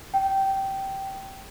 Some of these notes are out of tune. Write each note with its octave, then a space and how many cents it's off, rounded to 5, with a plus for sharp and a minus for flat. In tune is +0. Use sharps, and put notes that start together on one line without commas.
G5 -15